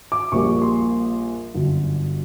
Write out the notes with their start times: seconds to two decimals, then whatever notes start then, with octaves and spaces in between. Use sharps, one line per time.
0.12 D6
0.32 A#1 A#2 G3 A#3 C#6
0.62 C6
1.54 G1 F#2 D3 F#3